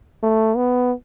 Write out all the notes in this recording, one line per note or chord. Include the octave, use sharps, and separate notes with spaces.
A3
B3